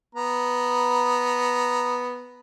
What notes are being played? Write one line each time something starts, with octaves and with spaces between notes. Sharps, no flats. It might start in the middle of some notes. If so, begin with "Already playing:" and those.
B3 A#5